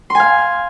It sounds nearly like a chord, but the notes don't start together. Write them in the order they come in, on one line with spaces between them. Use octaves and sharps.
C6 G#5 F5